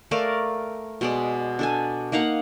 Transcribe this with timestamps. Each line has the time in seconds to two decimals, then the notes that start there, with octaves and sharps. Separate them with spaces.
0.11 A3 A#4 D5 F5
1.01 B2 G#3 D5
1.59 D4 A4 G#5
2.12 A#3 D#4 F5 F#5